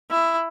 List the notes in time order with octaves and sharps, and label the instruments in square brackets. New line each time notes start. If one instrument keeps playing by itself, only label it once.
[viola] E4